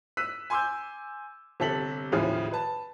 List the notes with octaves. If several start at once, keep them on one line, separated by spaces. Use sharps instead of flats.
E6 F#6 B6 D#7
G#5 C6 D6 E6 G6
G1 C3 A4 B6 F#7
D#2 A2 C#3 F3
B4 A5